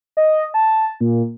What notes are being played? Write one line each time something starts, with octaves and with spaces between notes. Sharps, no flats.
D#5
A5
A#2